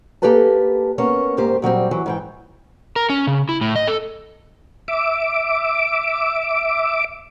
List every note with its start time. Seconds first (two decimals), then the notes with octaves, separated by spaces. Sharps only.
0.22 A#3 G4 A4 B4 G#5 A5
0.98 A#3 B3 C#4 C#5
1.37 D2 G#2 A#3 G4 C5
1.62 A#2 F#3 G3 C4
1.91 E3 F#3
2.06 G#2 E3 G5
2.96 A#4
3.10 C#4
3.27 C#3
3.49 E4
3.61 A2
3.76 D#5
3.87 A4
4.88 E5 D6